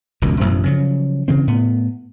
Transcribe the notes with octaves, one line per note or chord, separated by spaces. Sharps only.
E1 C#2 F#2
A1 F#2 B2 F3
C#3 F3 F#3
C#3 E3 C4
A2 B3